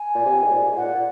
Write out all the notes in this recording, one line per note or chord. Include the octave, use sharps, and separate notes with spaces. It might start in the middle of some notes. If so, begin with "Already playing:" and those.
Already playing: G#5
A#2
C3
G#2
A#2
G#2
A#2 F#5
A#2